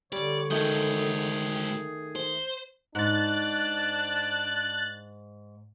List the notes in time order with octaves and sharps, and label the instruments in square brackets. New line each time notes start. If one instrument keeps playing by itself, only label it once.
[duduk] D3 [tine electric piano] G3 [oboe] C#5 [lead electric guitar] D5
[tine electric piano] D#3 A3 G6 [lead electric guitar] G#3 F#4 [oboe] G#4
[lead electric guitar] C5
[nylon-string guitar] G#2 [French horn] D4 [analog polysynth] F#6 A6